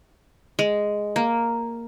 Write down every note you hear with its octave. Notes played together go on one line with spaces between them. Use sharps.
G#3
A#3